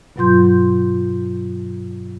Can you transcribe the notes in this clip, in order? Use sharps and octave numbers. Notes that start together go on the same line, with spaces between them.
G2 B2 F#3 F4 C6 G6